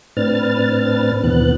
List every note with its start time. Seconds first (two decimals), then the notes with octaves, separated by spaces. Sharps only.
0.17 A2 C4 D4 B4 F6 A6
1.24 D#2 B2 E3 B3 F#6